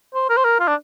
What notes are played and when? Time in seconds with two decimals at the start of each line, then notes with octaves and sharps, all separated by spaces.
0.14 C5
0.30 A#4
0.37 C5
0.44 A#4
0.60 F4
0.68 D4